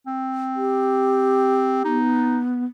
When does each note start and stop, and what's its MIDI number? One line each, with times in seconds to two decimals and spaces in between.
0.07 1.80 60
0.56 1.97 67
1.84 2.65 59
1.84 2.38 63